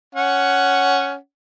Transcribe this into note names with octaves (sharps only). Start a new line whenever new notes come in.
C#4 F#5